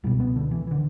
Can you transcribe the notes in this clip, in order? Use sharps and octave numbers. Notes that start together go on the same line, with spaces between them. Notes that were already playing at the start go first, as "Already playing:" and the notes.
C#2 B2 G3
B3
D3
E3
D3 E3